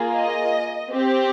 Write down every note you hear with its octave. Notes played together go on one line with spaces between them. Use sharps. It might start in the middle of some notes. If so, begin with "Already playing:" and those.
Already playing: A#3 F4 G#4
D#5
C4 G4